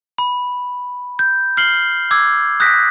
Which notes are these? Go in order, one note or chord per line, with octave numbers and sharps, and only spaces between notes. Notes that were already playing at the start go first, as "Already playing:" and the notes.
B5
G6
F6 C7 F#7 G7
D6 E6 G#6
D#6 F#6 G6 A#6 B6